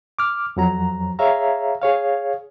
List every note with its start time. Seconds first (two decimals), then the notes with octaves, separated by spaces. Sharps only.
0.19 D6 F6
0.57 F2 F#3 A#5
1.19 G#4 C#5 E5 F5 A#5
1.82 G#4 C#5 F5